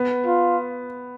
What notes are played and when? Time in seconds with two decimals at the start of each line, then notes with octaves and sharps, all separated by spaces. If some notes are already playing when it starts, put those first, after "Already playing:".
Already playing: B3
0.27 F4